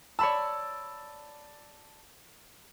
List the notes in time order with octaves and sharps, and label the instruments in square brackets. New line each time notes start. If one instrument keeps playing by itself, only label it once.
[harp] C#5 B5 E6 [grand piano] D5 A5